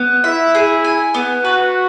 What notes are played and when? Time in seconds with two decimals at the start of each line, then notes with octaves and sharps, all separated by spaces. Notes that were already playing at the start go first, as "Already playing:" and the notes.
Already playing: B3
0.24 E4 E5
0.55 G#4
0.84 G#5
1.14 B3
1.44 F#4 B4